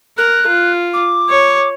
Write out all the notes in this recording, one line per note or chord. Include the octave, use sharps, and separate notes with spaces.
A#4 F#6
F4
D6
C#5